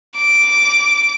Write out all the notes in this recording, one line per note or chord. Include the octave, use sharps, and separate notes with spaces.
D6